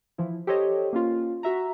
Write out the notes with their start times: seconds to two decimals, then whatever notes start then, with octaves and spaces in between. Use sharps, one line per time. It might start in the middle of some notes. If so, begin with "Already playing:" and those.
0.18 E3 F3 E4
0.47 G4 A4 C5 C#5 D#5
0.93 A#3 C#4 F4
1.43 F#4 E5 A#5